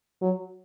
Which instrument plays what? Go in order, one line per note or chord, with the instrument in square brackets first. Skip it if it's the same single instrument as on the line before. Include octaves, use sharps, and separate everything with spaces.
[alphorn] F#3